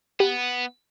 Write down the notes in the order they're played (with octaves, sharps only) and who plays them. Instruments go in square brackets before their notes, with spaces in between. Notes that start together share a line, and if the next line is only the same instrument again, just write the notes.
[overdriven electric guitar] B3 [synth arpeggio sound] G4